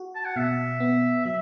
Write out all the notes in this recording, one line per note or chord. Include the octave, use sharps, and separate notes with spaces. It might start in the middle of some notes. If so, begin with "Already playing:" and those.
Already playing: F#4
A5
F#5
B2 E5
B3
F#3 E5